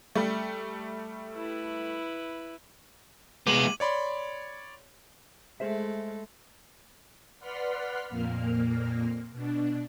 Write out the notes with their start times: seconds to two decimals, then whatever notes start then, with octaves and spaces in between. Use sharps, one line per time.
0.16 G3 A3
1.34 E4 B4
3.47 G#3 B3 D6 D#7 F#7
3.80 C#5 D5 B5 C6
5.60 G#3 A3 G#4 C5 E5
7.40 B4 D5 F#5 C6 F6 B6
8.09 F2 A#2 A#3 F6
9.31 B2 D4